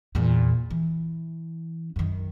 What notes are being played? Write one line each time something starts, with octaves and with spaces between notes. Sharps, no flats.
E2 A#2
E3
F#2 D#3